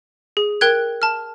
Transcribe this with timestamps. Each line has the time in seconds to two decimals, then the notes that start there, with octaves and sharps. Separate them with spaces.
0.37 G#4
0.61 A#4 G5 F#6 G#6
1.02 A5 F6